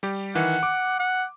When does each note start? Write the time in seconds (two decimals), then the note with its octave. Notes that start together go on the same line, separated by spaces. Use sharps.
0.03 G3 G4
0.35 D#3 E3 F#5
0.63 D6
1.00 F#5